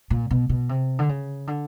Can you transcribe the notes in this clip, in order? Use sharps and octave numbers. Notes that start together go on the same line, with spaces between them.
A#2
B2
B2
C3
D3
C#3
D3